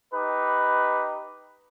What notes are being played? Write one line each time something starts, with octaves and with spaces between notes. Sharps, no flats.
D#4 G4 B4